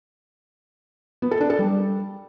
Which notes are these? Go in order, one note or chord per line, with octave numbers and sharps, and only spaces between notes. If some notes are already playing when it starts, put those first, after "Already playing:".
B3
A4
D4
A4
G3